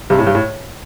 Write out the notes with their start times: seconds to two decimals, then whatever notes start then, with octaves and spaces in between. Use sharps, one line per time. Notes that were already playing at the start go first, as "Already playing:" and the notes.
0.10 G2 C3
0.19 A2
0.27 G2
0.35 A2